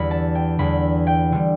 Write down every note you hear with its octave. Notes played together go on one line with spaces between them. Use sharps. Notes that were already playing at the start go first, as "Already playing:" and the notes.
Already playing: E2 D3 G3 B5
A5
G5
E2 D3 G3 B5
G5
D3 G3